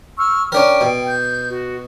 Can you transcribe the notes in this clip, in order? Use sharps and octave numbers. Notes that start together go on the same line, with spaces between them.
C#6 E6 F6
C#4 D4 A#4 G5
B2
G6
F#4